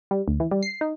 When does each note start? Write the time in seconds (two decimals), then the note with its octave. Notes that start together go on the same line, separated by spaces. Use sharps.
0.11 G3
0.28 D2
0.40 E3
0.51 G3
0.63 C7
0.81 D#4